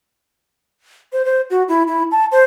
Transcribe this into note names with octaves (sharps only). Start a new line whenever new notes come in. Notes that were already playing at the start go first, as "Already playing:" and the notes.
C5
C5
F#4
E4
E4
A5
C5